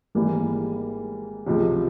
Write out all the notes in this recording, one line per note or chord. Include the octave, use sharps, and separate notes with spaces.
G#1 G#2 E3 G3 A#3
C#2 C3 F3 G#3